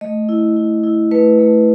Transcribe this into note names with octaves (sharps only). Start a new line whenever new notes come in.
A3 D#5
E4
E4
E4
A3 B4
A3